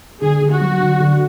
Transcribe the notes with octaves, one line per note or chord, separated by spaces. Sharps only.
D3 G#4
D3
F#4
F#3
D3
D3